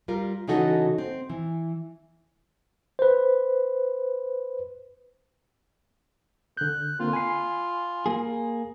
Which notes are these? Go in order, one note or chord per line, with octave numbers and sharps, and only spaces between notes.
G3 F4 A#4
C#3 E3 D#4 F#4 A4 D#5
C4
E3
B4 C5
D3 F#6 G6
D3 A#3 C4 F4
G#5 B5 C7
A#3 G#4